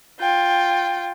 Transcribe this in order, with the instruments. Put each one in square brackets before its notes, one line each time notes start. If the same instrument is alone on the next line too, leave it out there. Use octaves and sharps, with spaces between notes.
[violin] F4 G5